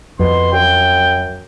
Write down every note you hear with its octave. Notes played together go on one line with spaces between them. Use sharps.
F2 B2 C6
F#2 G5